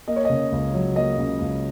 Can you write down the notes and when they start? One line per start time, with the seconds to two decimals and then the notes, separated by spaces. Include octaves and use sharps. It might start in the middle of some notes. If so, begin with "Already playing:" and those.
0.08 A#3 D#5
0.16 C#5
0.25 C#3 D#5
0.52 C#2
0.74 F#3
0.96 A#3 D#5
1.18 C#3
1.41 C#2